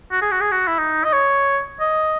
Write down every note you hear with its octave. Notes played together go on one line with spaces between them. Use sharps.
F#4
G#4
F#4
G#4
F#4
E4
D#4
D#5
C#5
D#5